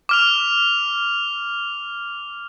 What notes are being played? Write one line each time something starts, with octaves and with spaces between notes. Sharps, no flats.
D6 F6 F7